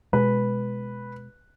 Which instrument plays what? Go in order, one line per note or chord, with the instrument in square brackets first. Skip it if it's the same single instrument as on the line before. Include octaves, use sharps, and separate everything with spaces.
[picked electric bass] B2 G#3 [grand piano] B4